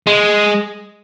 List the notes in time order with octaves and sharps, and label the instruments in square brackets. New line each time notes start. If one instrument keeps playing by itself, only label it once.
[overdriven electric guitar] G#3